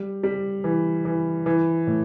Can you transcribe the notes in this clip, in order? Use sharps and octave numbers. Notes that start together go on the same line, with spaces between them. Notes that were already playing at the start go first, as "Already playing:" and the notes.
Already playing: G3
G3
E3
E3
E3
A2